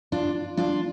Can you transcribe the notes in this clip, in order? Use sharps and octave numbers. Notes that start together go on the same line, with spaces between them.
D4 F4
D4 F4